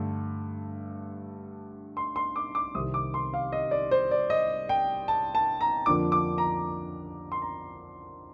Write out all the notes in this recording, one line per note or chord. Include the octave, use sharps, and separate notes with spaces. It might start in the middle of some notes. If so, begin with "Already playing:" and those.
Already playing: G2 D3 A3
C6
C6
D6
D6
C2 C3 D#3 D#6
D6
C6
F5
D#5
D5
C5
D5
D#5
G5
A5
A5
A#5
F2 D3 F3 A#3 D4 D6
D6
A#5
C6
A#5